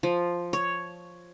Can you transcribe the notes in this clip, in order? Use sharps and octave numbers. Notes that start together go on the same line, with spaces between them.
F3
C#5